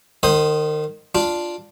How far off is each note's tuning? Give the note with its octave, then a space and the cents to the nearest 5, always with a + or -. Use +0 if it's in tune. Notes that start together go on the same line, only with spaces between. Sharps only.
D#3 -30 C5 +10 D#6 +0
D4 +0 F4 +0